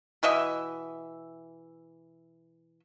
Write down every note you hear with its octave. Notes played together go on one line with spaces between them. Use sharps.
B2 E3 D#5 E5